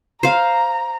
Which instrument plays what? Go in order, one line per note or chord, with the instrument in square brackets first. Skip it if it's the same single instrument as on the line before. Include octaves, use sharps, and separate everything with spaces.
[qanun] C5 F5 [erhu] A#5